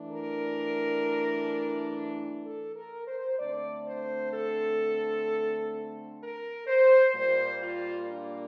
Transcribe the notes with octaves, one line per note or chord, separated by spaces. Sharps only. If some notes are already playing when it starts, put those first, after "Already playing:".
Already playing: E3 A3 D4
A#4
A4
A#4
C5
D3 A3 C4 D5
C5
A4
A#4
C5
A#2 G3 A#3 C5
F4
D4